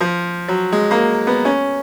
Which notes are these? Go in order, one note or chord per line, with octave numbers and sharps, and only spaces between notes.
F3
F#3
G#3
A#3
B3
C#4